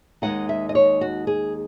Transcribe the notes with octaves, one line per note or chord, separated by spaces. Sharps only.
D#2 D#3 G#3 D#4 F#5
E5
D#5
C#5
F#4
G#4